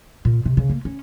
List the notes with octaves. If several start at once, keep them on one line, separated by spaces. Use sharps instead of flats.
A#2
C3
C#3
A#3
C#4